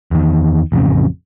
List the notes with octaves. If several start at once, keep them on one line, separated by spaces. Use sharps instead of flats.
E2 D#3
A1 F2 C#3